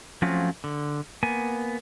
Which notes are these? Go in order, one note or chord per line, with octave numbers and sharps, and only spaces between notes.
F3 F#3 A3 C4 C#4 F4
D3
A#3 B3 G#5